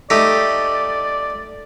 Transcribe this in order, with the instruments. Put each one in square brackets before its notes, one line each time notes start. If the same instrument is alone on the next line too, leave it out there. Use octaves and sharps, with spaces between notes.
[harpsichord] A3 D#4 G4 [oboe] D5